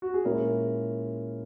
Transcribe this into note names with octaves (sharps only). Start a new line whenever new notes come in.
F#4
G#4
A#2 G#3 C#4 E4 A#4